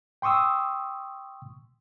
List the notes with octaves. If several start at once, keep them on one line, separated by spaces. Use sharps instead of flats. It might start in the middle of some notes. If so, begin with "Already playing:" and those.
G5 C6 C#6 D#6 E6